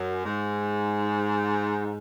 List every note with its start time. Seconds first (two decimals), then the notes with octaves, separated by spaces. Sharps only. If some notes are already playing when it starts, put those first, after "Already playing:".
Already playing: F#2
0.26 G#2